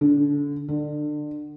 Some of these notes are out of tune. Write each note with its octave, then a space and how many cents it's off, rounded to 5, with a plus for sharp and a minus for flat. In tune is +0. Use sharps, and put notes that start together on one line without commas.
D3 -25
D3 +25